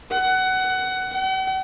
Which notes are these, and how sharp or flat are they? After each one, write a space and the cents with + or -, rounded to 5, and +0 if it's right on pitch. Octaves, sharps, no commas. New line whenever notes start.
F#5 +20
F#5 +45